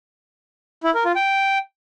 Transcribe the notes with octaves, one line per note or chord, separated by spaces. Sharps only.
E4
A#4
F4
G5